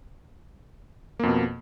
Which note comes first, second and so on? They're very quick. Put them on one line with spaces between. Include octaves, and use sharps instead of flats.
A#3 F2 B2